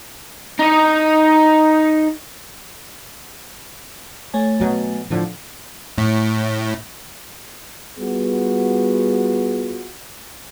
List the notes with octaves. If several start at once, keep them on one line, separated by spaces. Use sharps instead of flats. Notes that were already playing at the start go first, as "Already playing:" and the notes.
D#4 D#5
A3 C#5 G#5
B2 F#3
A2 D3 F3
A2
G3 B3 F4 F#4 G#4